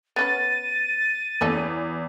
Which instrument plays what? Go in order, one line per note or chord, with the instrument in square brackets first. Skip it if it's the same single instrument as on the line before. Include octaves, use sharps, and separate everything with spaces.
[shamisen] B3 C#4 B4 [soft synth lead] A6 [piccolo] D#7
[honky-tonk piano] E2 [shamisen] G3 C#4 A4